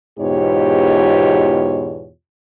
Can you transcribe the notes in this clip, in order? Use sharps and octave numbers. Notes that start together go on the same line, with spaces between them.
E2 G#2 B2 F4 G4 C#5